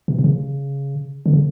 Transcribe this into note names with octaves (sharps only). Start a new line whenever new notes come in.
C3
C3
C#3
D3
C#3